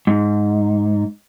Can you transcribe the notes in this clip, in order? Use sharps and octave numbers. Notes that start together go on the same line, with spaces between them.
G#2